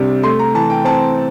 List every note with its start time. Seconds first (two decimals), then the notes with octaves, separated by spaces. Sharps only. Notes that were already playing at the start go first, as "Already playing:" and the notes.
Already playing: C3 G3 D4
0.23 A3 C6
0.39 A#5
0.54 E3 A5
0.70 G5
0.85 C4 A5